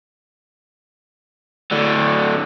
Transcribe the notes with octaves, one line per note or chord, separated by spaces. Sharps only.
A2 D3